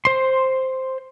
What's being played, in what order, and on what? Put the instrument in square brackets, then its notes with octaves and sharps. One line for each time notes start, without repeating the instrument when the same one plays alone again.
[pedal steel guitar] C5 C6